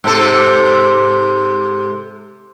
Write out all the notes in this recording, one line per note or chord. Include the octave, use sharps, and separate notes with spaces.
G#2 C3 A4